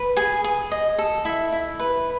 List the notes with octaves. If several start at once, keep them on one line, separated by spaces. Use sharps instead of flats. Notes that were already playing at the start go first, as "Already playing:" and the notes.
Already playing: B4
G#4 G#5
G#4
D#5
A4
E4 E5
E4
B4